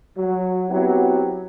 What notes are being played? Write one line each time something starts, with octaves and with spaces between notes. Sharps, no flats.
F#3
F#3 B3 C4 E4 G4